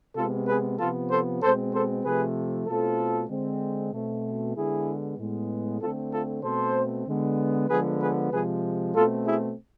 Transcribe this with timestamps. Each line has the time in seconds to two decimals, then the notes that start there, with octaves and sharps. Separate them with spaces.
0.16 C3 G#3 B3 F4 A4
0.48 G#4 B4
0.79 C3 F3 B3 F4 A4
1.10 A4 C5
1.42 B2 G#3 C4 A4 C5
1.73 A4 C5
2.05 C3 F3 A3 G#4 B4
2.67 B2 A3 C4 F4 A4
3.30 D3 G#3 C4
3.93 B2 A3 C4
4.56 D3 G#3 B3 E4 G#4
5.19 A2 G#3 B3
5.81 D3 A3 C4 F4 A4
6.12 F4 A4
6.44 B2 A3 C4 A4 C5
7.07 D3 G#3 B3
7.69 D3 F3 G#3 B3 G#4 B4
8.01 G#4 B4
8.32 C3 F3 G#3 G#4 B4
8.95 B2 A3 C4 F4 A4
9.26 E4 G#4